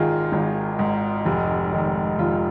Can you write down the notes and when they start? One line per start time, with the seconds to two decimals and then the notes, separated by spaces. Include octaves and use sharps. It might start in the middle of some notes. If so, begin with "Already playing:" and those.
Already playing: G#1 D#3 F4 G#4 A#4
0.32 G#1
0.79 G#2
1.25 F1
1.72 D#3
2.19 F1 F4